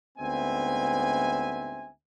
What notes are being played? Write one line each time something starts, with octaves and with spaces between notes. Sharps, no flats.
D2 G#2 B3 C4 E5 G#5